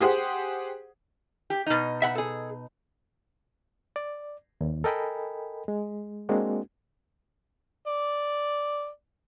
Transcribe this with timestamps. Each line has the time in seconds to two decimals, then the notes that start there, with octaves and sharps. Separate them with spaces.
0.01 G4 G#4 C5 F#5
1.50 G4
1.66 B2 D#4
2.02 E5 F#5 B5
2.15 G#4 A4
3.96 D5
4.61 D#2
4.84 A4 A#4 D#5 G5 G#5 B5
5.68 G#3
6.29 G#3 A#3 C4 D4 F#4
7.87 D5